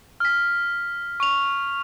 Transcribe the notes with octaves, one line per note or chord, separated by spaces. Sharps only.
F6 B6
C#6 F7